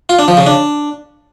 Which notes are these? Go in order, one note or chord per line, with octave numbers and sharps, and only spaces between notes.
F4
D4
F3
C#3
D4